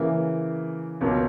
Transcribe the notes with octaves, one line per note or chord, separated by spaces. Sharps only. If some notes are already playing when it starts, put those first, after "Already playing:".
Already playing: C#3 E3 A#3
C#2 B2 F#3 A#3 C#4